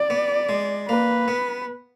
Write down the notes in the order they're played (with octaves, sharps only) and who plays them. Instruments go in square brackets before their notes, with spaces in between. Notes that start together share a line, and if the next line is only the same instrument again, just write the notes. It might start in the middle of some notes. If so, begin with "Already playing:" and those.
Already playing: [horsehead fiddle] D5
[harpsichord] B3
G#3
[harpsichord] A#3 [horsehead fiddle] B4
[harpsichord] B3